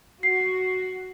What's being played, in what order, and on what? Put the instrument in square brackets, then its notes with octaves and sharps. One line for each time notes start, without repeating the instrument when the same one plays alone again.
[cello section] F#4 [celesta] C7